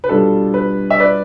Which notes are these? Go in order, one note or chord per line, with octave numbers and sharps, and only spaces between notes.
B4
B2 G3 D4 F4 A4
B4
E5
B4 D5